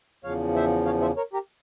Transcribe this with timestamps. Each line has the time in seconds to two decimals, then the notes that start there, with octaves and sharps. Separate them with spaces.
0.24 E2 C#3 F3 C#5 F5
0.55 C5 E5
0.86 C#5 F5
1.01 C5 E5
1.17 A#4 C#5
1.33 G4 A#4